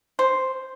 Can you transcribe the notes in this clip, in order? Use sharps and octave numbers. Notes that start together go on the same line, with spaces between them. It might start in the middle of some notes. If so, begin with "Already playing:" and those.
C5